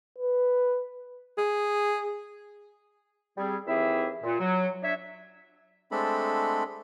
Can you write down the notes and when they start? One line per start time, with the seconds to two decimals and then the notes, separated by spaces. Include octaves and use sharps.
0.18 B4
1.38 G#4
3.38 G3 C4 G#4
3.67 D#2 E3 C4 E4 G#4 E5
4.23 A#2
4.40 F#3
4.83 D4 C#5 E5
5.91 G#3 A3 C4 D4 A4 B5